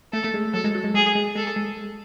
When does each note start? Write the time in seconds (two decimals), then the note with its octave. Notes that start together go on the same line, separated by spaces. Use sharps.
0.13 A3 A4
0.24 A3
0.34 G#3
0.54 F#3 A4
0.64 G#3
0.75 F#3
0.84 G#3
0.94 G#3 G#4
1.15 G#3
1.35 G#3 A4
1.56 G#3